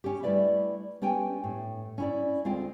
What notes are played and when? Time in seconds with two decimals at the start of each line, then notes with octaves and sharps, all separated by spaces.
0.04 C#4 G4
0.23 G3 A3 E4 B4 D5 E5
1.02 B3 C#4 G4 G5 G#5
1.44 A2
1.98 C#4 E4 D5
2.45 D2 G#3 C4 F4 G5